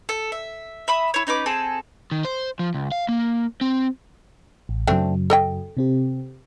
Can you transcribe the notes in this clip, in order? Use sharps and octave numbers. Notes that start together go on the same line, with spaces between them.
A4
E5
E5 B5 D#6
E4 C#5
C#4 D#4 B4 D6
C4 G#4 A4
D#3
C5
F3
C#2
F5
A#3
C4
A1
F#2 C#3 F#3 A3 C4 D4
A4 D#5 G5
C3 C4 G4